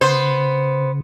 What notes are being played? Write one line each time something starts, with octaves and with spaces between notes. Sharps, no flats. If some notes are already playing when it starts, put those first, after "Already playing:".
C#3 B3 C5